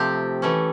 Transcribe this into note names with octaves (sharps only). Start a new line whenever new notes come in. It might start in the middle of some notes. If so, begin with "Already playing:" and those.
Already playing: C3 F3 A3 C4 G4
E3 A3 C#4